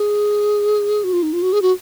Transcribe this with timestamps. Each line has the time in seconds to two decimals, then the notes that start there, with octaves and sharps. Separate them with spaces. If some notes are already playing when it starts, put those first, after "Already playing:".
Already playing: G#4
1.04 F#4
1.13 F4
1.23 D#4
1.33 F4
1.42 F#4
1.53 G#4
1.62 F#4